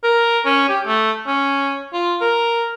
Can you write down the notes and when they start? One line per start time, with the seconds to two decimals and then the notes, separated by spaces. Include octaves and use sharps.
0.03 A#4
0.46 C#4
0.69 G4
0.87 A3
1.27 C#4
1.93 F4
2.21 A#4